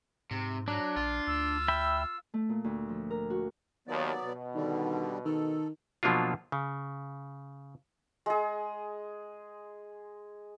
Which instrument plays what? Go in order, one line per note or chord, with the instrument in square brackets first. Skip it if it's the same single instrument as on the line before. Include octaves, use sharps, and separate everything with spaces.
[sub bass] G#2 [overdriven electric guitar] C3
[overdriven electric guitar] F#3 [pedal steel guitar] D4
[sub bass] A#1 [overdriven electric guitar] F4
[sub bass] D2 [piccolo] E6
[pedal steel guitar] E5 G5 B5
[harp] A3
A#2
D2
F3
A#4
F#4
[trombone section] D#2 [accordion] F#3 B3 D5
[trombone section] B2
[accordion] D3 G3 [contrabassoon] D#3
[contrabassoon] D#3 [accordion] A4
[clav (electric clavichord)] B2 F3 F#3 A#3 D4 F4
C#3
[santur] G#3 G#4